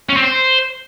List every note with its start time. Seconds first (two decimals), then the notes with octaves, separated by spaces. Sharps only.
0.09 C#4
0.17 C4
0.24 C5